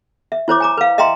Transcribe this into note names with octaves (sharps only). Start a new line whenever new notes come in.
E5
E4 C5 C#5 D6
G#5 A#5 D6
B4 F5
D#5 E5 G5 A#5 C6